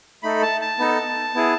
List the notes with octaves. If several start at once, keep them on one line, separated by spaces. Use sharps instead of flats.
A3 D#4 A4 B5
A5
A5
B3 D#4 A4
B3 E4 G#4